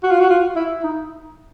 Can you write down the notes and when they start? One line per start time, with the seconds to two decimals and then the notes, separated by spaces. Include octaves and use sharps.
0.03 F#4
0.11 F4
0.20 F#4
0.30 F4
0.56 E4
0.84 D#4